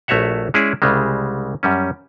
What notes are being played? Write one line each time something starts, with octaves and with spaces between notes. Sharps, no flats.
A#1 A3 F#4 C#5 E5 F#5
G#3 C#4 E4 G#4 D5
C2 C#3 G3 G#3
F#2 G3 C#4